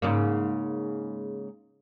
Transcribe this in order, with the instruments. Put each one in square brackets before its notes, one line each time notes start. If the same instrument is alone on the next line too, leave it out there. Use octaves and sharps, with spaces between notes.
[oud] G#2 C#3 A#3